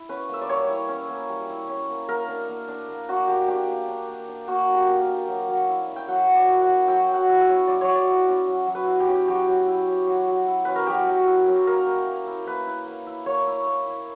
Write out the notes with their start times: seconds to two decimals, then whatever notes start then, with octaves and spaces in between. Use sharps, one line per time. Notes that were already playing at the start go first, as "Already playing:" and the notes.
Already playing: E4
0.09 C#4 B4
0.29 A#3 E5
0.41 D5
0.48 G3 C#5
0.69 E4
0.89 C#4
1.09 A#3
1.29 G3
1.49 E4
1.68 C#4
1.89 A#3
2.08 A#3 A#4
2.28 D4
2.49 A#3
2.68 D4
2.88 A#3
3.09 D4 F#4
3.28 A#3 G4
3.48 D4 G4
3.68 A#3
3.88 D4
4.08 A#3
4.28 D4
4.48 A#3 F#4
4.69 D4
4.75 G4
4.88 A#3
5.01 A#4
5.09 D4
5.28 F#3
5.48 F#3
5.69 E4
5.87 C#4
5.96 G5
6.08 F#3 F#5
6.27 F#3
6.35 D5
6.48 E4
6.62 F#5
6.68 C#4
6.88 F#3 G5
7.08 F#3
7.14 F#5
7.28 E4
7.41 E5
7.48 C#4
7.67 F#3 D5
7.81 C#5
7.88 F#3
7.95 D5
8.07 E4
8.28 C#4
8.47 F#3
8.67 F#3
8.75 B4
8.87 E4
9.00 G4
9.08 C#4
9.28 F#3 G4
9.47 F#3
9.67 E4
9.87 C#4
10.07 F#3
10.27 F#3
10.47 E4
10.65 C#4 B4
10.76 A#4
10.87 F#3 G4
11.07 F#3
11.26 E4
11.48 C#4
11.67 A#3 A#4
11.87 E4
12.07 A#3
12.27 E4
12.46 A#3 B4
12.67 E4
12.87 A#3
13.06 E4
13.26 A#3 C#5
13.47 E4
13.67 A#3
13.86 E4